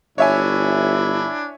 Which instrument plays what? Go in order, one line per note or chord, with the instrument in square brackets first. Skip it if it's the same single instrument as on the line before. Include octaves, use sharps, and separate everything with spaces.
[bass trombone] G1 [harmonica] D4 E4 [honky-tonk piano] C#5 E5 G#5